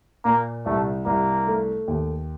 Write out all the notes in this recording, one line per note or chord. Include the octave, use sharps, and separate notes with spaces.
A#2 A#3
C2 A3
C2 A#3
A3
D#2